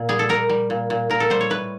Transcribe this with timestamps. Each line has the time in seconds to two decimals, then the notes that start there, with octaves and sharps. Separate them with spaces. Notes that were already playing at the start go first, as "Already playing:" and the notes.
Already playing: A#2
0.09 G3 G#4
0.19 A4
0.29 G3 A#4
0.50 G3
0.70 A#2
0.90 A#2
1.10 A#2 A#4
1.20 A4
1.30 G3 C5
1.41 C#5
1.50 A2 B4